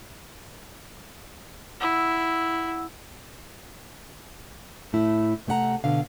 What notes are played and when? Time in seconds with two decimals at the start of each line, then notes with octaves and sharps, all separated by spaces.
1.81 E4 F#5 E6
4.93 A2 A3 E4
5.47 C3 A3 G4 F#5 A#5
5.84 B2 D3 F5